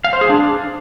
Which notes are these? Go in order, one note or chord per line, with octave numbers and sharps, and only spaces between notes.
F5
C5
G#4
D4